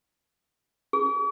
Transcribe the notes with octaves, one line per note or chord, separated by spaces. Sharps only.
G#4